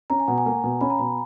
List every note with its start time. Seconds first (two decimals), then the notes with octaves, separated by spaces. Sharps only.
0.10 C#4 A#5
0.20 G#5
0.28 B2 F#5
0.38 G#5
0.46 A#3
0.64 B2
0.81 C#4 B5
0.90 A#5
0.99 B2 B5